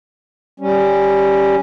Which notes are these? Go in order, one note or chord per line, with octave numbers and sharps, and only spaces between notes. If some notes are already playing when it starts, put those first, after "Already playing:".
G3 C#4